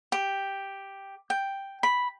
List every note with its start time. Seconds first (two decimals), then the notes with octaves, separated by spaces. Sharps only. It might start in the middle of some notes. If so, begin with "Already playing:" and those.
0.12 G4
1.30 G5
1.83 B5